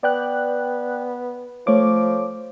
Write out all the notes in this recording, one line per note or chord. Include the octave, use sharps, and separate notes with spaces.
B3 D5 G5 F#6
F3 A3 C#5 D6